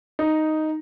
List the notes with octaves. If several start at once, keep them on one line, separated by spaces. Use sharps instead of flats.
D#4